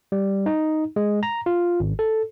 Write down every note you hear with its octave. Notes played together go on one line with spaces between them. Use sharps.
G3
D#4
G#3
A#5
F4
G#1
A4